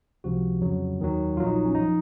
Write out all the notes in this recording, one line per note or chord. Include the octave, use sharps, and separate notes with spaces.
C#2 C3 F3 F#4
F2 C#3 F#3
D#2 D#3 F#3
A#1 A#2 F#3 F4
D#4
C#4
F#2 F3 D#4